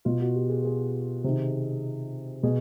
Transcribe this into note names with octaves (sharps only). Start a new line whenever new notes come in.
B2 F4
F#4
G4
G#4
G#4
C3 D#3
B2 G#4